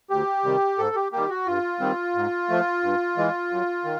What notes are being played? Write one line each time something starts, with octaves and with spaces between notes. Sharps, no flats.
D2 G4
C3 D#3 G3
G#2 A4
G4
D#3 G3 A#3 G4
F#4
G2 F4
D#3 G3 C4
G#2
F3 A3
G2
E3 G#3
F#2
D#3